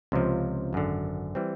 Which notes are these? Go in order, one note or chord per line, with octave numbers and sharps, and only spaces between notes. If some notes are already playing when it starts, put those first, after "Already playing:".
C#2 C3 F3
G#1 F#2 D3
E3 G3 C4